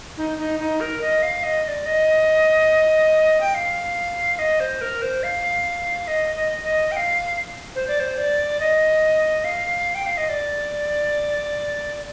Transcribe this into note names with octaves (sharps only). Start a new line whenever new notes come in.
D#4
D#4
D#4
A#4
D#5
F5
D#5
D#5
D5
D#5
G5
F5
D#5
C5
A#4
C5
F5
D#5
D#5
D#5
G5
F5
C5
D5
C5
D5
D#5
F5
G5
F5
D#5
D5